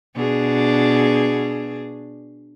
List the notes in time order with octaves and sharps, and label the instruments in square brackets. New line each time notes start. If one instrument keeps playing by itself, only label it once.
[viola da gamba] B2 D4 G#4